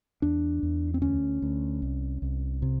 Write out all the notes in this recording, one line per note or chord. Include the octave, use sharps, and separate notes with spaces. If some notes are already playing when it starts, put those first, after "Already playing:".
E2 D4
E2
C4
D2 C#4
D2
C2
C2
C3